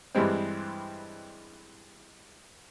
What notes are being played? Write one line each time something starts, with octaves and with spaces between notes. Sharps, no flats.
G2 E3 G3 G#3 C4